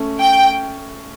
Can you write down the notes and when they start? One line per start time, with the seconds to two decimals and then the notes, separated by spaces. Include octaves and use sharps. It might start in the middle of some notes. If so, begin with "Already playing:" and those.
Already playing: A3 C#4
0.20 G5